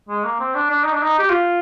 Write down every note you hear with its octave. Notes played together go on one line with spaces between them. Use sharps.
G#3
A#3
C4
D4
D4
D#4
D4
D#4
G4
F4